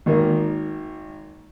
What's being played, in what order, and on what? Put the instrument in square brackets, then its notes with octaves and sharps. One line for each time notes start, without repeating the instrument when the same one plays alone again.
[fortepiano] G#1 D#3 A#3